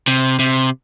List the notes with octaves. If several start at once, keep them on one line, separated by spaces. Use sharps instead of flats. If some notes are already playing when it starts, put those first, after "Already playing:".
C3
C3